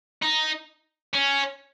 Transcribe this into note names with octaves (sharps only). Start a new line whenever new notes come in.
D#4
C#4